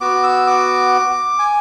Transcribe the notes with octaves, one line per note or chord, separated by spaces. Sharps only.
B3 F#4 D6
E6
D6
G#5